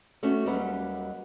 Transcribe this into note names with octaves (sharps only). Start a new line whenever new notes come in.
A3 B3 C#4 D4 F#4 A4
D#2 D#3 F#3 G3 B4 F#5